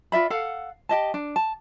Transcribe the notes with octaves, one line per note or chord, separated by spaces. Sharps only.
F4 D5 E5 B5
A4 F5 F#5
G4 D#5 A5
D4
A5